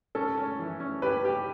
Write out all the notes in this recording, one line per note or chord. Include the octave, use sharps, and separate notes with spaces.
C#4 A4
C#4
E3
C#4
G4 B4
G4